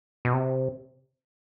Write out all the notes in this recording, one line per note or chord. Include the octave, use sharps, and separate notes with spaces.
B2
C3